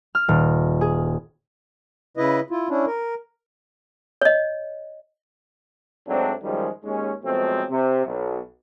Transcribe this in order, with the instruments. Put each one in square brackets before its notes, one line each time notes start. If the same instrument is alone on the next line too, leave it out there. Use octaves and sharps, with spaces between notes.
[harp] F6
D#1
G#4
[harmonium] C#3 E4 B4 D#5
E4 F4
C#4 D4 E4
A#4
[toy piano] C#5 D#5
[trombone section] G#2 F#3 A3 C4 D4
F#2 D#3 F3 G3 G#3
D#2 G#3 C#4
B2 F3 F#3 G#3 A3 C4
C3
B1